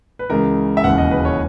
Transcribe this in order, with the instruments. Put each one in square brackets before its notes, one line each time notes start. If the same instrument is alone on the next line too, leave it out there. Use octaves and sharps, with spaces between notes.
[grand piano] B4
C#2 C#3 E3 A#4
E5
E1 D#2 C#3 E3 F#5
D#5
B4
C#5